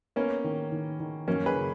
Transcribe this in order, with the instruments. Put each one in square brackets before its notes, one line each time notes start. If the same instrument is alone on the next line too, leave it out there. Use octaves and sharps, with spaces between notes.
[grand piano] A#3 C#4 [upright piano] B3
[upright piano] D#3
D#3
D#3
[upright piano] F#2 [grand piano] A#3 C#4
[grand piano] G#4 B4
[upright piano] C#3